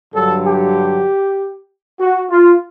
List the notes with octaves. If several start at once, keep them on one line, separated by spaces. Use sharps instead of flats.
G2 D3 F#3 A4
G4
F#4
F4